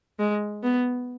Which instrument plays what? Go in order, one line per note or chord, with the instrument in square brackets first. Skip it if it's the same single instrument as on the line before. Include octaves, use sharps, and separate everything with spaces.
[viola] G#3
B3